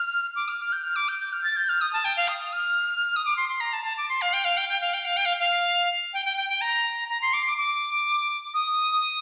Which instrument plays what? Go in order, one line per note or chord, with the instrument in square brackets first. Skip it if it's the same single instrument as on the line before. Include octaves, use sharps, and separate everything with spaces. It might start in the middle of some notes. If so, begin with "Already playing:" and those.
Already playing: [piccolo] F6
D6
F6
F6
G6
F6
D6
G6
G6
F6
A6
G6
F6
D#6
A5
G5
F5
D#6
F6
D#6
D6
C6
C6
A#5
A5
A5
D6
C6
F5
G5
F5
G5
G5
F5
G5
F5
G5
F5
F5
G5
G5
G5
G5
A#5
A#5
C6
D6
D6
D6
D#6